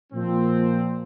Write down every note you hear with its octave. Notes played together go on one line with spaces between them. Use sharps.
A#2 F3 C4